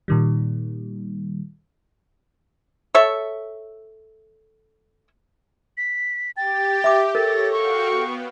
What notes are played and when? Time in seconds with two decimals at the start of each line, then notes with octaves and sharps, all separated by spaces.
0.08 A#2 D#3 G3
2.95 A4 C#5 E5
5.77 B6
6.37 G4 G5 A6
6.84 E5 D6
7.15 A4 A#4 C#5 A6 A#6
7.52 F#4 F5 G5 C#6
7.90 B3